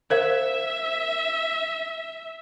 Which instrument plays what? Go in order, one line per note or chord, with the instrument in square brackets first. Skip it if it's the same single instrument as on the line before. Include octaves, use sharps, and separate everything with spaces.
[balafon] A#4 C5 F5 [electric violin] E5